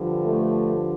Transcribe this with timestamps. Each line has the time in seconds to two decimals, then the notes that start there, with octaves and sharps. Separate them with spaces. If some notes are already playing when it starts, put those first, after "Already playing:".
Already playing: G2 D3 F3
0.25 A3